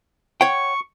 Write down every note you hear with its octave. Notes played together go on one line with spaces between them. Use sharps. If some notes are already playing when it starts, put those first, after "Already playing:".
C#5 F#5 G5 C#6